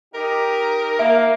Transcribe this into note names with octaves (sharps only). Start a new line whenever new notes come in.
D#4 G4 A#4
A#3 E5